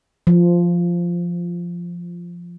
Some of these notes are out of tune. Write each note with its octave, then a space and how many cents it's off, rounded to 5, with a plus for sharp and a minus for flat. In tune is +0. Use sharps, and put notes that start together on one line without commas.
F3 -5